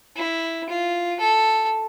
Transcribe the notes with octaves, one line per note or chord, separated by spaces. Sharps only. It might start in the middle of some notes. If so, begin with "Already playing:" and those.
E4
F4
A4